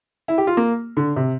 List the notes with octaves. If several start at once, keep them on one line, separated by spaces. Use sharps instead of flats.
E4
G4
F4
A#3
D3
C3